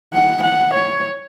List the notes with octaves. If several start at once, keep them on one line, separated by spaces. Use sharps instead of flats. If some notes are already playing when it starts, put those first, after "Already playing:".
F#5
F#5
C#5